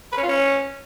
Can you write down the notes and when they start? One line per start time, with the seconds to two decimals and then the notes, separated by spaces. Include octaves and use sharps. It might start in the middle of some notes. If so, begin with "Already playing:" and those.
0.12 B4
0.17 C#4
0.23 F4
0.28 C#4